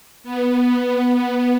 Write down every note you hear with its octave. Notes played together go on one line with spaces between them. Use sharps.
B3